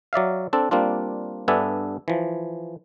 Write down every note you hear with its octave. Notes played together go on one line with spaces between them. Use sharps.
F#3 D5 E5 F5
C4 D4 A4
G3 A#3 C4 D4 F4
G2 B3 D4 A4 E5 G#5
E3 F3